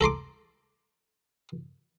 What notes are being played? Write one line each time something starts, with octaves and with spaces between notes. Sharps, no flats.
A4 A#5 C6 D6